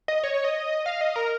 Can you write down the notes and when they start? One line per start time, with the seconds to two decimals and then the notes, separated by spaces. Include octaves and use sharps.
0.08 D#5
0.24 C#5
0.34 C#5
0.44 D#5
0.86 F5
1.01 D#5
1.16 A#4